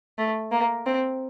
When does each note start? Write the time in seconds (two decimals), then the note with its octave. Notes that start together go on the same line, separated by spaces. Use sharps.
0.19 A3
0.52 A#3
0.86 C4